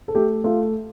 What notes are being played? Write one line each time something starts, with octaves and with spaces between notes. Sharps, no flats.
A4
A3 G4
A3 F4